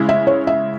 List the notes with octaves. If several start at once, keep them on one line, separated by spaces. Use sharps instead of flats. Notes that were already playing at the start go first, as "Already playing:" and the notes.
Already playing: C#3 G#3 E4
E5
C#5
E5